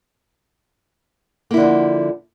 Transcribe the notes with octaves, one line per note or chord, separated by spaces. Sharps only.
D3 F3 A#3 E4